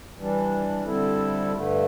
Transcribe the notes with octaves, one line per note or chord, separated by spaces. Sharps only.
E3 G3 D4
D3 G3 C4 E4 A4
G2 D3 A3